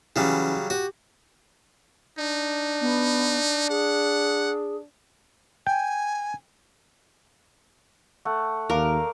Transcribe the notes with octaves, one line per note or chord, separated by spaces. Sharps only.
C#3 E3 F#3 G3 C#4 E4
F#4 G4
D4 D#4
B3
G#4 F#5
G5 G#5
A3 F#5
D#2 A#4 D5 F5 D6